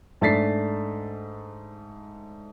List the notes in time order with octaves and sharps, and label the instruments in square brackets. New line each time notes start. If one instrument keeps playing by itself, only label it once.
[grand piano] G#2 A3 D4 A6 B6 C7